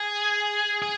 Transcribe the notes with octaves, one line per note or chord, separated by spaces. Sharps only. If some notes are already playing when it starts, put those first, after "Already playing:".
Already playing: G#4
G#4